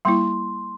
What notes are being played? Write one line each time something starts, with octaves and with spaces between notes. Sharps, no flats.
G3 A#3 E4 C6